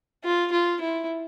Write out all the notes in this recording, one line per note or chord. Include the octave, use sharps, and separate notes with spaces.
F4
F4
E4